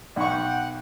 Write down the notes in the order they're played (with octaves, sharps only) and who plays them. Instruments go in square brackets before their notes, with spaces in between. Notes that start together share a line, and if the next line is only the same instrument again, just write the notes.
[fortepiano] B1 C#6 [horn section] F#5 G5